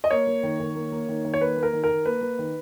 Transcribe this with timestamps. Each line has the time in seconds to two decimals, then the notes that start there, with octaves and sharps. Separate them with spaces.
0.04 D#5
0.11 A#3 C#5
0.27 A#3
0.43 D#3
0.60 D#3
0.75 A#3
0.92 A#3
1.09 D#3
1.25 D#3
1.34 C#5
1.41 A#3 B4
1.57 A#3
1.63 A#4
1.73 D#3
1.84 A#4
1.89 D#3
2.05 A#3 B4
2.21 A#3
2.39 D#3